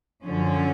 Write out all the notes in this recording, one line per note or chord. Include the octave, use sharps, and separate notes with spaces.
F#2 D3 F3 C#4